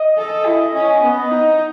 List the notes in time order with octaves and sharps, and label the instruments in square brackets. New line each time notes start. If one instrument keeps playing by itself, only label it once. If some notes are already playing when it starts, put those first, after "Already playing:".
Already playing: [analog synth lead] D#5
[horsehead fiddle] A4
E4
C#4
B3
D#4